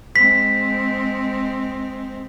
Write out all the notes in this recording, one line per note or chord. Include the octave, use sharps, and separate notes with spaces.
G#3 C4 B6